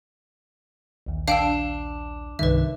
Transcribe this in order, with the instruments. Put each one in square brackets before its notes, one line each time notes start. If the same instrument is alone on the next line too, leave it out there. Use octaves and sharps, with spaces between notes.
[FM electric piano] A#1 D#2
[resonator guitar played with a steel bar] D4 [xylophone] F5 G5 E6
[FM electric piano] C2 G2 D#3 [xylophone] B4 E5